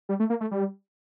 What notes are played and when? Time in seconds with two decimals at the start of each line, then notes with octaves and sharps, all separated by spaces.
0.09 G3
0.20 A3
0.30 A#3
0.41 A3
0.51 G3